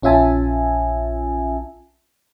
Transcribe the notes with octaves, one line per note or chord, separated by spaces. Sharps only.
A#1 C#4 F4 E5 G#5 A5